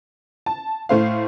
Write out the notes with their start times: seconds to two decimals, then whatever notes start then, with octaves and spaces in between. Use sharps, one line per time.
0.46 A5
0.89 A2 A3 C5 F5